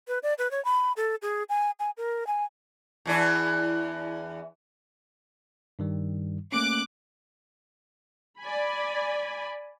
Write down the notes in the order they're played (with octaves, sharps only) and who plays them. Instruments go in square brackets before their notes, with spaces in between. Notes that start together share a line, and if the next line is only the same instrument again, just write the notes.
[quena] B4
D5
B4
C#5
B5
A4
G#4
G#5
G#5
A#4
G#5
[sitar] E2 E3 D4
[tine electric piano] G2 D#3 G3
[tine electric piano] A3 A#3 C#4 [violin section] D6 F#6
[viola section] D5 G#5 B5